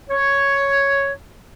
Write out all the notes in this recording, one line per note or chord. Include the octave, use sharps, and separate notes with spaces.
C#5